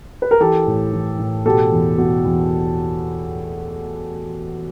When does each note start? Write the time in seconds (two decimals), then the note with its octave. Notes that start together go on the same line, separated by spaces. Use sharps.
0.22 B4
0.31 A#4
0.40 E3 G4 A4
0.67 A2
0.93 E3
1.19 A2
1.46 B2 G4 A4
1.72 E2
1.98 B2
2.24 E2